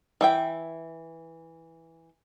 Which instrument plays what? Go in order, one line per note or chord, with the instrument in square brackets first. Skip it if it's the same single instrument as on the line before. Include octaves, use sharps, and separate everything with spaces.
[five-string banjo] E3 E5 G5